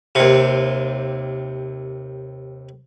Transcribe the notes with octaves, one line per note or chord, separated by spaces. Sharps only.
D#2 C3